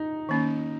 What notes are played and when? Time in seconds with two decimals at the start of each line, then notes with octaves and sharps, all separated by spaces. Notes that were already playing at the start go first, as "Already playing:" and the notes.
Already playing: D#4
0.29 D#3 A#3 C#4